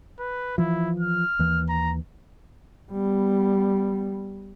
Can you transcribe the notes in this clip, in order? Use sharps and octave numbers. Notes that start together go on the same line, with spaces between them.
B4
E3 F3 E4
F6
D#2 E3
A#5
G3 B3